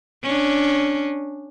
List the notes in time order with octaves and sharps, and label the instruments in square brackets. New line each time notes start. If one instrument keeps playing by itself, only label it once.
[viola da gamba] C#4 D4